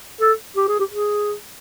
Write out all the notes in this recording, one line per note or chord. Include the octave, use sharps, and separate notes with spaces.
A4
G4
G#4
G4
G#4